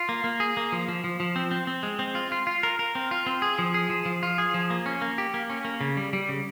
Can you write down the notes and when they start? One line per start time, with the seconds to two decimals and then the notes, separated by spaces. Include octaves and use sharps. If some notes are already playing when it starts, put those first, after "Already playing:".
Already playing: F4
0.09 A#3
0.24 A#3
0.40 G#4
0.57 A#3
0.72 F3
0.88 F3
1.04 F3
1.20 F3
1.36 C4
1.51 C4
1.67 C4
1.83 G#3
1.99 C4
2.15 F4
2.32 F4
2.47 F4
2.63 A#4
2.79 A#4
2.95 C4
3.11 F4
3.26 C4
3.42 G#4
3.59 F3
3.74 G#4
3.90 F3
4.06 F3
4.23 F4
4.38 G#4
4.54 F3
4.70 A#3
4.86 C#4
5.02 A#3
5.18 G4
5.34 A#3
5.50 C#4
5.65 A#3
5.81 C#3
5.97 G3
6.13 G3
6.29 C#3